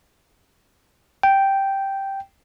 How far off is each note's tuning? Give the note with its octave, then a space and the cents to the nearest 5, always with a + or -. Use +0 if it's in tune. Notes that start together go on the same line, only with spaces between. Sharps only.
G5 -5